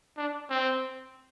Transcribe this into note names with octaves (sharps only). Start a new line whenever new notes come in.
D4
C4